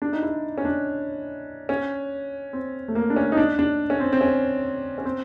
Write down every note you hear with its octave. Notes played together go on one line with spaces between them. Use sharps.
D4
D#4
E4
C#4
D4
C#4
C4
A3
A#3
D4
C#4
D#4
D4
D4
C#4
C4
C4
C#4
C#4
C4